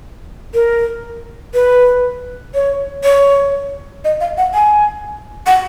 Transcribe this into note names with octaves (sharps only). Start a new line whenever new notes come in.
A#4
B4
C#5
C#5
D#5
F5
F#5
G#5
F#5